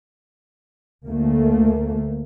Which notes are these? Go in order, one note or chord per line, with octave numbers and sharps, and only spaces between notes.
D2 A3 A#3